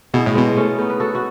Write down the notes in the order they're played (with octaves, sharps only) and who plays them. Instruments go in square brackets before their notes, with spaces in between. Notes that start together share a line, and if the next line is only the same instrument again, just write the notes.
[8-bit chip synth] B2 [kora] E4 G#4
[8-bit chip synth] A2
[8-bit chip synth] B2 [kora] G#3 B3
[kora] A3 C#4
B3 D#4
B4
F#4 A4
F#4